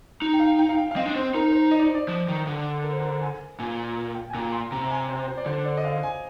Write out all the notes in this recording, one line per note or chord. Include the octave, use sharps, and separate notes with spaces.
D#4
G5
F5
G5
F5
G5
F5
C4 D#5
D4
C4 C5
D#4 A#4
A#4
C5
D#5
D5
C5
D5
F3
D#3
D3
A#4
C5
A#4
G#5
A#2 G#5
G5
G#5
A#2 A#5
C6
C3 A#5
A#5
G#5
C5
C5
D5
D3 C5
D5
D#5
F5
G#5